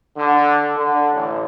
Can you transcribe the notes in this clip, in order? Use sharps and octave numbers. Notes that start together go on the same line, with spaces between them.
D3
D3
A1